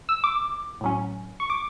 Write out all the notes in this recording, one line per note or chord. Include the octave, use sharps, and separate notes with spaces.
E6
D6
A2 F#3 C#4
C#6
D6